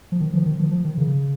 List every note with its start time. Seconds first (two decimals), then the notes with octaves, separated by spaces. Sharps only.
0.12 F3
0.20 D#3
0.34 F3
0.46 D#3
0.60 F3
0.71 F3
0.84 D#3
0.98 C#3